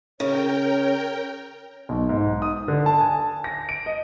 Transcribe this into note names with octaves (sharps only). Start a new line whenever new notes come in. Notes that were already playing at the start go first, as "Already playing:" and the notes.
C#3 A#4 C#5 G5
B1
G#2
D#6
D3
A5
G#5
A#6
D7
D#5